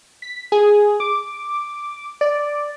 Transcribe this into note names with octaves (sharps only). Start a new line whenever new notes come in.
B6
G#4
D6
D5